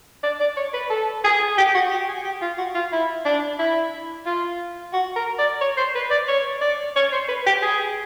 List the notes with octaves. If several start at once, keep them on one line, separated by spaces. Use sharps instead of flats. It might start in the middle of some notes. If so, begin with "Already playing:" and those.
D5
D5
C#5
B4
A4
G#4
G4
F#4
G4
G#4
G4
F4
F#4
F4
E4
D4
E4
F4
F#4
A#4
D5
C#5
C5
B4
D5
C#5
D5
C#5
C5
B4
G4
G#4